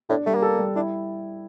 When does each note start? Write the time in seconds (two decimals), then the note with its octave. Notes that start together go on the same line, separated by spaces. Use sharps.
0.09 A2 D4
0.26 G3 A3
0.35 A#3
0.42 A4
0.59 G3
0.76 D4 E4